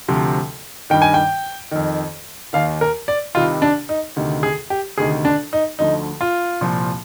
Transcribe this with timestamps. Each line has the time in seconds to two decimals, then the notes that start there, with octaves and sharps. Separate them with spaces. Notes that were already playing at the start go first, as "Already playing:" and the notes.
0.08 D2 C3 F3
0.90 G2 D#3 G5
1.02 G#5
1.14 G5
1.71 F2 D#3
2.53 D#2 D#3 F5
2.81 A#4
3.08 D5
3.35 C2 C3 D#3 F4
3.62 D4
3.89 D#4
4.16 D2 C3 D#3
4.43 G#4
4.70 G4
4.98 D2 C3 D#3 G#4
5.25 D4
5.53 D#4
5.79 D2 D3 F3 D#4
6.21 F4
6.61 C2 A#2 F3